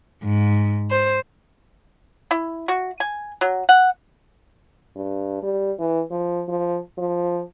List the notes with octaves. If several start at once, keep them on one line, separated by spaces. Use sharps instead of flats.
G#2
C5
E4
F#4
G#5
F#3
F#5
G2
G3
E3
F3
F3
F3